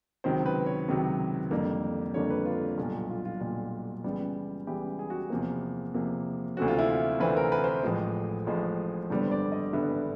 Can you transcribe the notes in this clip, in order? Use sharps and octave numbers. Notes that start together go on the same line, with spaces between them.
C#2 C3 D#3 F#3 C5
B4
C#5
C#2 C3 D#3 F#3
F2 D3 G3 A#3
F2 D3 G3 A#3 C#5
B4
F4
B1 A#2 G3 F4
F4
F4
B1 A#2 G3 F4
C#2 C#3 E3 G3 B3
C#2 C#3 E3 G3 B3 G4
G#4
F#4
G4
E2 C3 F3 A#3
E2 C3 F3 A#3
D2 C3 E3 A3 C4 F#4
F4
E4
F4
D2 C3 E3 A3 C4 B4
A#4
B4
C5
B4
A1 A2 F3 G#3
A1 A2 F3 G#3
G#1 G2 D3 G3 B3 C5
D5
D#5
G#1 G2 D3 G3 B3 E5